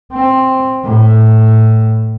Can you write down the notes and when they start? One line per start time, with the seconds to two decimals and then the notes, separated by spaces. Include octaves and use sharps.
0.13 C4
0.84 A2